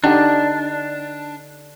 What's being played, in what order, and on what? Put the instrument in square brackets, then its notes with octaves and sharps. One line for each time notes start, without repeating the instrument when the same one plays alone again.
[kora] D3 D#4 G4 [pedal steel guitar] D4